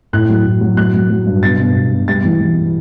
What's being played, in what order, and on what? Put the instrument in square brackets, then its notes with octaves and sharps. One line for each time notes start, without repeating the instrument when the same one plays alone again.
[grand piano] A2 F#6
F#3
A2
F#3
F#3 F#6
F#3
F#3
G2
B2 A6
B2
B2
B2
G3 A6
E3
E3